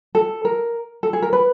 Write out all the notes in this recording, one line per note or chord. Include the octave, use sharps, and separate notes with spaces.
A4
A#4
A4
G#4
A#4
B4